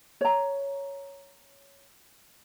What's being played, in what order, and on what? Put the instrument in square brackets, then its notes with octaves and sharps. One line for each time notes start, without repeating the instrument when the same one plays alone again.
[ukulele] C#5 A#5